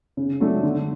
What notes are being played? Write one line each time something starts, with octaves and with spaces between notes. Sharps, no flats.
C#3
F#3 A3 D4
D3